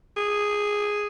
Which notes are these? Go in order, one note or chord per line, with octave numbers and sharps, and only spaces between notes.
G#4